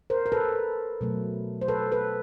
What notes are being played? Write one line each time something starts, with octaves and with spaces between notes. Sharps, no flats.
A#4 C5
A#4
A4 B4
B2 F#3 A3
C5
A4 B4
A4 B4